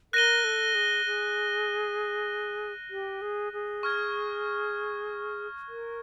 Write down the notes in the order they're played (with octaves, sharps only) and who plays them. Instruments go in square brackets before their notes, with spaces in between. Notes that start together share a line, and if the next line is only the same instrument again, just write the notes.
[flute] A#4 [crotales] F#6 A#6 D#7 G7
[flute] A4
G#4
G#4
G4
G#4
G#4
[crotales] C#6 F6 G#6
[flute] A#4